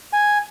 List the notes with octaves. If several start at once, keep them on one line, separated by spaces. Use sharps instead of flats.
G#5